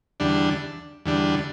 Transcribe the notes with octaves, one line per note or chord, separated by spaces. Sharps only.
E2 D3 G3 D4
E2 D3 G3 D4